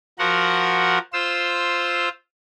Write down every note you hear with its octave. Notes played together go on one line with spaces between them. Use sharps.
F3 F#4 A#4 F#5
F4 C5 E6